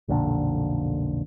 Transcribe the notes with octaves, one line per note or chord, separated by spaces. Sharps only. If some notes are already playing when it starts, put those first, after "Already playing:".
B1 F2 A#2 D3